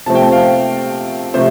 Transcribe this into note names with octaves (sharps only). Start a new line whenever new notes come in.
C3 F3 A3 C4 A5
G5
A5
F5
G5
C3 F3 A3 C5